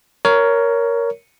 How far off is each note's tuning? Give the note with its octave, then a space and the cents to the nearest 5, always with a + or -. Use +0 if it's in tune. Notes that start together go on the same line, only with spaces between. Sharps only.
A#4 +0 C#5 +15